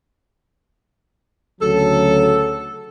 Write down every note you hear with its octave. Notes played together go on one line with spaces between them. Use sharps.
D2 C#3 F#3 A4